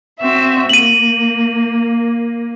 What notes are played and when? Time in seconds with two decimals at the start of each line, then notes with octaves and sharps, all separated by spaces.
0.20 C4 F#4 E5
0.69 A#3 D#7 F#7